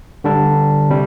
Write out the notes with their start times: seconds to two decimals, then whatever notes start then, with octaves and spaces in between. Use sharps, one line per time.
0.24 D3 G3 D4 A4
0.90 C3 G3